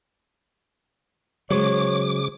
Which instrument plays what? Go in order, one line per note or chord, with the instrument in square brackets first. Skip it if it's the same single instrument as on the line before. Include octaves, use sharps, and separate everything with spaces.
[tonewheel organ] C#3 D6 [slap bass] F#3 [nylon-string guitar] G#3 C5 [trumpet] C#5